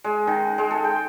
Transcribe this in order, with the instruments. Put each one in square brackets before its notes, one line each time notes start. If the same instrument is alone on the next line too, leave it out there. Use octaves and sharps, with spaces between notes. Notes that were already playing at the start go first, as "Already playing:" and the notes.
[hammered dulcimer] G#3
D#3
G#3
A4
G5